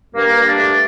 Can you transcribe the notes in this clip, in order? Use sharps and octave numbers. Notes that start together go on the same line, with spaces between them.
G2 A#3
G2
D4
A3